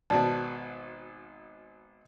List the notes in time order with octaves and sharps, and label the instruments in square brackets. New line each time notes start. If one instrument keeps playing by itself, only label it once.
[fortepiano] G#1 B2 F#4 [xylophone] D5 A5